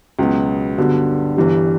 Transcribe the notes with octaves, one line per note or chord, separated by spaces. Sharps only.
C#2 B2 F#3 B3
G2 D3 F#3 B3
G1 G2 E3 G3